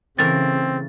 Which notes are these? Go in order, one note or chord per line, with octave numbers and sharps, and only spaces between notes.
C#3 E3 A3 C4 A#4 A6